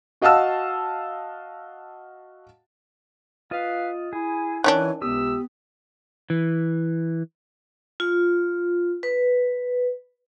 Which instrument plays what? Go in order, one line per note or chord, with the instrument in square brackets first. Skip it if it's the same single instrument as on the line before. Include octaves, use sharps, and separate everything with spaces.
[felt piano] F#4 D#5 F5 F#5 A5 E6
[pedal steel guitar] F4 D#5 [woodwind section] B4 F5
[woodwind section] E4 [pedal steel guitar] G#4
[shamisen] D#3 C#4 D4 [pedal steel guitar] E3 F#6 [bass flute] C#5
[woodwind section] C#2 C3 E6 [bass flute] B3 [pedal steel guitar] G4 D#6
[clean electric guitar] E3
[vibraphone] F4
B4